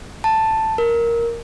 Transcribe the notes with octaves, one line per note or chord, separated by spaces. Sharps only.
A5
A#4